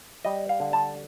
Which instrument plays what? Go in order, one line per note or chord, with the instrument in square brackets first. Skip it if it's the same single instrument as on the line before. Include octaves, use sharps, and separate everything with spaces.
[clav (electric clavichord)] G3 D#5
F5
D3
A5